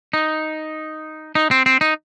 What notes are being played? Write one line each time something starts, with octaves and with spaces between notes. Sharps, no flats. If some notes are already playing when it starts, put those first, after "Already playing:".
D#4
D#4
C4
C4
D#4